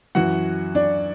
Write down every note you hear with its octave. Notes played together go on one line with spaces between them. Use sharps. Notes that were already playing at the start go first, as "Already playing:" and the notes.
F#2 E3 F#4 F#5
D4 D5